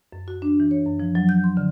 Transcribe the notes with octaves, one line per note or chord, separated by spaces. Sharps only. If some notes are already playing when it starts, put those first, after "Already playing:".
F#2
F#4
D4
E3
C#5
F#2
F3
F#3
G6
C6
D3